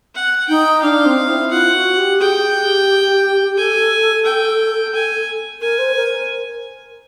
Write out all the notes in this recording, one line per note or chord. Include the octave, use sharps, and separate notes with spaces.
F#5
D#4 G5
D4 F5
C4
E4
F4 F#5
F#4
G4
G#4 G5
G4
A4 G#5
G5
G#5
A#4 G#5
C5
A#4